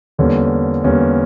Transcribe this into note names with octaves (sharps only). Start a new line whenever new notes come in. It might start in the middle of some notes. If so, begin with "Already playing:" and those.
E2 D3 G3 A#3 C#4
E2 D3 G3 A#3 C#4